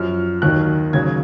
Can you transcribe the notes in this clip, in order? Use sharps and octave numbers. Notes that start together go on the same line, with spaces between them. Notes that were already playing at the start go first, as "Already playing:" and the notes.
Already playing: F#2 F3 F6
D#2 D#3 F#3 F#6
D#2 C#3 F#3 G#6